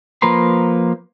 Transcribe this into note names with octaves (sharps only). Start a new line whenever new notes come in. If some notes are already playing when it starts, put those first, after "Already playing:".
F3 A#3 B4 A#5 C6